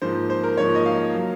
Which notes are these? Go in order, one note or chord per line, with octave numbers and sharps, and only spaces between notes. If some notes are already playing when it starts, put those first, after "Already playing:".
G#2 F3 A#3 C5
C5
A#4
G#2 F3 A#3 C#5
D#5
F5
F#3 A#3